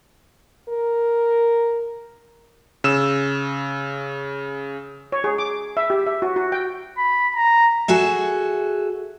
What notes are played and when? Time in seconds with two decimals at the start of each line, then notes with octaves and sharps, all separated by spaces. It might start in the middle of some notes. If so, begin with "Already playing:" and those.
0.69 A#4
2.84 C#3 E6 E7
5.12 C#5
5.24 G#4
5.38 D6
5.77 E5
5.90 G4
6.07 E5
6.22 F#4
6.36 F#4
6.52 G5
6.98 B5
7.35 A#5
7.88 F#4 G#4 A4 E5